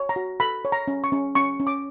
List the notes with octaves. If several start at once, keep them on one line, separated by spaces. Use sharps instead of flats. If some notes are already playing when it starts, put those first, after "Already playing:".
Already playing: C#5
A#5
F#4
A4 B5
C#5
A#5
C#4
C#6
C#4
C#4 C#6
C#4
D6